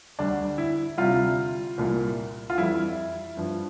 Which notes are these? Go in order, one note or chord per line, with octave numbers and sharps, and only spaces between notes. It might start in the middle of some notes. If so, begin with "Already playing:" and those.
D2 D3 G3 D4
E4
D2 C3 G3 F4
C2 A#2 G3
F4
F2 E3 G3 E4
G2 F3